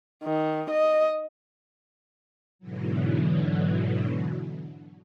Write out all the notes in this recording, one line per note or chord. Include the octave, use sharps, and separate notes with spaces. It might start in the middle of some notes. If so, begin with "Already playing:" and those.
D#3
D#5
G#2 B2 D3 E3 F#3